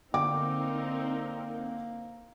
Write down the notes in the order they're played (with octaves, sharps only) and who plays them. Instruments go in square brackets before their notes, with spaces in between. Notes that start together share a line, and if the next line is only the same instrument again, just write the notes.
[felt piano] D3 G5 D6 [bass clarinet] A#3 [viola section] C4 D#4 A#4